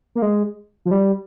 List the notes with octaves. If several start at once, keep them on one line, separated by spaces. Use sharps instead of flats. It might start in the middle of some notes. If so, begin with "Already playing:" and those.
A#3
G#3
F3
G3